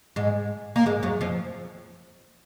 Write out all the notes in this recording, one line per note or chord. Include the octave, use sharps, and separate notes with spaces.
G#2 G#3
A#3
G#2 G#3
F#2 F#3
F2 F3